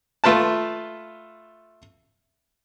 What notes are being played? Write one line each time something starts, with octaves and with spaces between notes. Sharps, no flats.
A3 F4 B4 A5